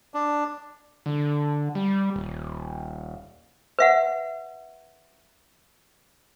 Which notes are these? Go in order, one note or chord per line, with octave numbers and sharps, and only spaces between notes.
D4
D3
G3
D#1
B4 E5 F#5